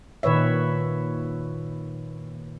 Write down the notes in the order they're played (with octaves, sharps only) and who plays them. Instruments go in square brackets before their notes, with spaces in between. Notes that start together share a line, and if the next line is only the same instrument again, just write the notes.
[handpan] A#2 D#3 B4 C#5 E5